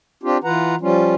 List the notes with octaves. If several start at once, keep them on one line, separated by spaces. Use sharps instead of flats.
C4 D4 F4 G4
E3 F4 B4 F#5 A#5
F3 G3 C#4 F4